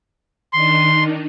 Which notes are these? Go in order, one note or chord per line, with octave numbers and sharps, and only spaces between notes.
D#3 D4 D#4 C6